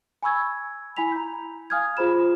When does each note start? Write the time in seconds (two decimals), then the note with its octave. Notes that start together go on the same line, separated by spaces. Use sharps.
0.23 G#5 B5 C#6 E6 G#6
0.97 E4 G#5 B5 B6 F7
1.12 A#5 G6
1.70 F5 G#5 D#6 F6 G6 G#6
1.97 F4 G#4 C5 B5 E7